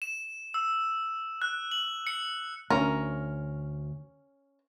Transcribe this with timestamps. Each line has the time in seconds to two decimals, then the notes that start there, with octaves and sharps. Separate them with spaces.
0.02 E7
0.54 E6
1.42 F#6
1.71 F#7
2.07 C#7
2.70 D2 C#4 A#4